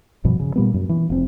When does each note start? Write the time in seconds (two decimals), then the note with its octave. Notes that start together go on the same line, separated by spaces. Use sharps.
0.24 G#1 G2 B2 F3
0.40 C#3
0.56 A#2 G3 B3
0.74 F#2
0.89 E3
1.10 F1 C4